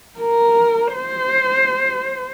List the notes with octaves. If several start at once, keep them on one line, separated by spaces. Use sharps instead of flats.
A#4
C5